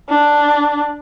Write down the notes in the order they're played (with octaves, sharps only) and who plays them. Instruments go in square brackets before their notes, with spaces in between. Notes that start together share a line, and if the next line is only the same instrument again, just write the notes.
[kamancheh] D4